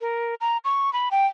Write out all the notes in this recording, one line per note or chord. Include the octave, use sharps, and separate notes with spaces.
A#4
A#5
C#6
B5
G5